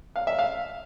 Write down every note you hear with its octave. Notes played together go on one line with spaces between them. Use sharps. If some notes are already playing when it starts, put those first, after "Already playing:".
F5
E5
F5